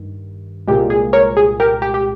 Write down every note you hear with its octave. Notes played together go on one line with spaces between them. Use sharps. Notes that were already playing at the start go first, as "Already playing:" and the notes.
Already playing: G2 D#3
C2 A#2 G#3 G4
G#4
A#4 C#5
G#4
G4 A#4
G4
G4